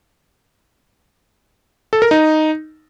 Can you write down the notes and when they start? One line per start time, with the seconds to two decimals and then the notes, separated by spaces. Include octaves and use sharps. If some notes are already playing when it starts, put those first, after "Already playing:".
1.93 A4
2.02 A#4
2.11 D#4